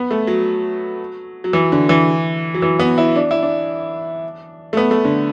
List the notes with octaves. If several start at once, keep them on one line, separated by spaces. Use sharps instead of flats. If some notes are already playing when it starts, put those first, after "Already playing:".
Already playing: B3
A3
F#3
F#3
E3
D3
E3
F#3
E3
B3
E4
D4
E4
D4
A3
B3
A3
D3